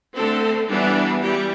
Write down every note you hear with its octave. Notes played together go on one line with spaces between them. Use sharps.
D3 A3 C4 A4
E3 G3 B3 D4
E3 G3 G4